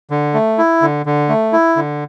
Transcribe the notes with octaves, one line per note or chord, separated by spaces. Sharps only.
D3
A3
E4
D3
D3
A3
E4
D3